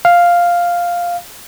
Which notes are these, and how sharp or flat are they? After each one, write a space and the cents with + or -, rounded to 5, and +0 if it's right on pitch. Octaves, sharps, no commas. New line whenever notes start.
F5 +0